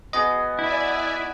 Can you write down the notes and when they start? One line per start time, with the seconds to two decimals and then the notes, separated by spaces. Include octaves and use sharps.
0.13 B3 F#4 G#4 D#5
0.59 E4 D5 E5 G#5